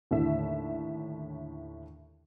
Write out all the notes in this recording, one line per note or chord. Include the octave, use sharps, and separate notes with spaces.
D#2 A2 D3 E5